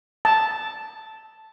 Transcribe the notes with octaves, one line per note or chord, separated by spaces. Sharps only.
A5